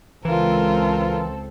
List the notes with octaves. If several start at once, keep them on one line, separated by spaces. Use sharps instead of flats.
C#2 E3 C4 F4 A4 A#4